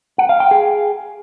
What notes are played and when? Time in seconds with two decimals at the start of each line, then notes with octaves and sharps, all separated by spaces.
0.18 F#5
0.29 F5
0.40 G5
0.51 G#4